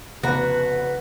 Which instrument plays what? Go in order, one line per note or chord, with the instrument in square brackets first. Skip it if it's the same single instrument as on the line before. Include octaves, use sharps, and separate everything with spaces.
[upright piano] F1 B3 A#5 [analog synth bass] C#3 [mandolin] F#4 [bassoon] B4